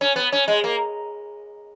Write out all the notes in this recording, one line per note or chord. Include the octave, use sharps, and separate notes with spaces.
C#4
B3
C#4
G#3
A#3